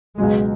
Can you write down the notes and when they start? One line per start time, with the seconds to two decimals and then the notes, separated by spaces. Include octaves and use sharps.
0.18 C#2 B2 F#3 G#3